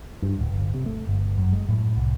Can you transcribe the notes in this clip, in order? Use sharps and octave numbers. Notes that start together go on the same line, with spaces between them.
G2
D1
G1
C3
A3
G1
F#2
G#3
A2
C2